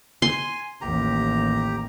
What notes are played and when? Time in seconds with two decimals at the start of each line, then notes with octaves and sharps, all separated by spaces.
0.22 G#5 C6
0.81 A1 D#2 G4 A#5